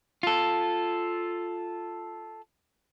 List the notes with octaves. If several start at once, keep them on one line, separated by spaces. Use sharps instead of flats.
F4 A4